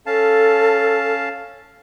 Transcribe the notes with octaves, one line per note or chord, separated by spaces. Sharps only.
C#4 A4 F5 A5